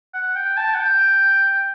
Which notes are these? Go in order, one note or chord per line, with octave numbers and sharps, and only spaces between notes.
F#5
G5
A5
F#5
G5